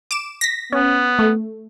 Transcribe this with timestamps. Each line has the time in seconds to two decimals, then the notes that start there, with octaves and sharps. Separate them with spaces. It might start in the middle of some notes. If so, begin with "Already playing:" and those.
0.11 D6 D7 E7
0.41 A#6 B6
0.72 B3 C#4
1.19 A3